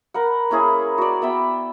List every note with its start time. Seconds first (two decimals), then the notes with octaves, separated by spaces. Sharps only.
0.14 A#4 B4 F#5
0.50 A#3 C#4 E4 G#4
0.98 F#4 D5
1.22 B3 E5 G5